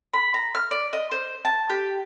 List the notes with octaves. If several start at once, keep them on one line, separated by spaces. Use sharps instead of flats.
B5
A#5
F6
D5
D#5
C5
A5
G4